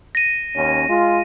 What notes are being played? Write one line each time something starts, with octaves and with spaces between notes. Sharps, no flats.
A#6 D#7
D#2 C#4
G#3 F4